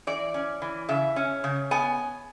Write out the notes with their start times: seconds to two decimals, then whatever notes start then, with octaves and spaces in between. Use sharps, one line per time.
0.07 E3 D5
0.34 C#4
0.62 E3
0.89 C#3 E5
1.16 C#4
1.44 C#3
1.71 B3 G#5